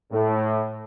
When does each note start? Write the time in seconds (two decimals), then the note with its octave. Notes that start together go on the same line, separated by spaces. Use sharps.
0.11 A2